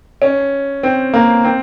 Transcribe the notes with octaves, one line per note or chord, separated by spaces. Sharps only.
C#4
C4
A#3
C4